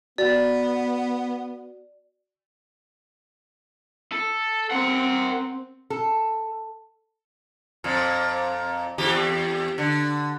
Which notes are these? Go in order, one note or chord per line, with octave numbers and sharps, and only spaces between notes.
B3 F#4 D5
A4
C4 A#4 F#5
A4
F2 A#2
E2 G4
D3